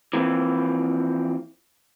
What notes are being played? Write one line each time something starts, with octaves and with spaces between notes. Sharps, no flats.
E3 F3 A#3 C4